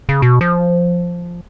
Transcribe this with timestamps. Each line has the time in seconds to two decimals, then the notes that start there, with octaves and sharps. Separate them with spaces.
0.09 C#3
0.22 B2
0.41 F3